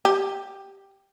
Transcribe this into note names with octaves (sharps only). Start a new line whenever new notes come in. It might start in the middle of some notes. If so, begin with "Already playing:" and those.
G4